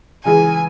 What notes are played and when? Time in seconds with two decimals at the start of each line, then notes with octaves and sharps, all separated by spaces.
0.25 C#3 E3 G#3 G#5